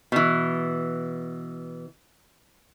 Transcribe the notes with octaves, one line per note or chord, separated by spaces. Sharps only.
B2 E3